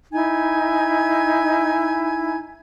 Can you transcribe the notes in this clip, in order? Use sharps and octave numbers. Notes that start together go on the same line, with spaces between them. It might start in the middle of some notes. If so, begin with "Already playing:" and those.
D#4 E4 G#5 G#6